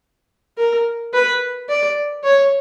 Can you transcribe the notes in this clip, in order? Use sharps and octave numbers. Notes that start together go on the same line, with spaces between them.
A#4
B4
D5
C#5